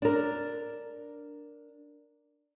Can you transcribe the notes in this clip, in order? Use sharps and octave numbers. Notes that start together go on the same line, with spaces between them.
D4 A#4